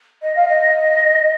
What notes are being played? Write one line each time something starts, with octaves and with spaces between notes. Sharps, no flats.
D#5
F5
D#5